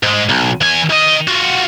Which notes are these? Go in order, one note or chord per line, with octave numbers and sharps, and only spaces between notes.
G#2 G#3
B1
E2 G#5
D#3 D#5
F4 F#4